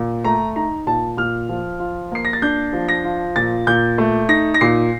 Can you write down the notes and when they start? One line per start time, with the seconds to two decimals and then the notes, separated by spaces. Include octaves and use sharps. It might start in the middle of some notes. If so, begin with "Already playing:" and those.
Already playing: A#2
0.24 A3 A#5
0.56 D#4 A#5
0.86 A#2 A5
1.17 A#2 F6
1.49 F3
1.79 F4
2.12 A#3 C7
2.25 A#6
2.33 A6
2.42 D4 G6
2.73 F3
2.89 A#6
3.04 F4
3.36 A#2 A6
3.67 A#2 G6
3.98 A3
4.29 D#4 A#6
4.54 A#6
4.61 A#2 C7